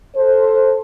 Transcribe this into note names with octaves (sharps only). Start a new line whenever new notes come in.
A4 C5